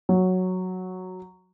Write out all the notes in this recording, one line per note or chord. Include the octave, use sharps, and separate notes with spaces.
F#3